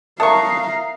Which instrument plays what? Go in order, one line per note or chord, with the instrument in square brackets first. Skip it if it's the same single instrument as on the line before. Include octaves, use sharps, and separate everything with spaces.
[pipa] A4 C#6 [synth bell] A#4 E5 D#6 [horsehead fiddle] F5 A#5